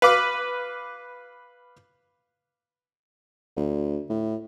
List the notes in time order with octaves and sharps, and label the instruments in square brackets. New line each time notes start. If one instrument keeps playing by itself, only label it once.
[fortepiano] B4 F5 D6
[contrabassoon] D2
A2